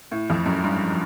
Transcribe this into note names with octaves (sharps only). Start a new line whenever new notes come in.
A2
F2
F#2
G2